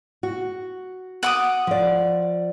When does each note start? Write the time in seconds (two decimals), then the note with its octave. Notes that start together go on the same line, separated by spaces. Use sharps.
0.23 F#4
1.23 F#5 D6 D#6
1.67 F3 D5